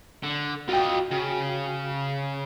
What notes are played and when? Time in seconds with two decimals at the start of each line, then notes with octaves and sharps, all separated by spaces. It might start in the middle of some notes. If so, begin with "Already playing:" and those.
0.23 D3
0.69 F4 F#4 D#5 G5
1.11 C#3